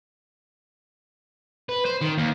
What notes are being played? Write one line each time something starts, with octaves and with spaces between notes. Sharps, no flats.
B4
C5
D#3
D#2